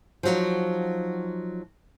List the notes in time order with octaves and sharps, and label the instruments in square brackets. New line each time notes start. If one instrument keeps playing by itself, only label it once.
[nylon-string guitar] F3 F#3 D#4